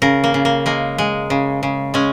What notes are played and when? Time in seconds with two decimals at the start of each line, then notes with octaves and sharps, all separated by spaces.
0.02 C#3 A#4
0.24 A#3
0.34 C#3
0.45 A#3
0.66 G#3 A#3
0.98 G#3
1.30 C#3
1.63 C#3
1.94 G#3 C#4